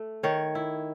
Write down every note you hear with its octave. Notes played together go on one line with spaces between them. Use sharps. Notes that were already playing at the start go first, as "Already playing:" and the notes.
Already playing: A3
D#3 C#5
E4